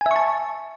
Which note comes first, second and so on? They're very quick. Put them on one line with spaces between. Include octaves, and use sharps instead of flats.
G#5 E5 C#6 A5